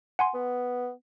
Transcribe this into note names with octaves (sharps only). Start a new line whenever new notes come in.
F#5 G#5 C6
B3